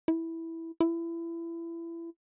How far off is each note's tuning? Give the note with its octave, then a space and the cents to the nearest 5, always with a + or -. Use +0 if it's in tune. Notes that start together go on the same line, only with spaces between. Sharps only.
E4 -5
E4 +25